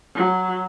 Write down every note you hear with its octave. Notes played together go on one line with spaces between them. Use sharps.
F#3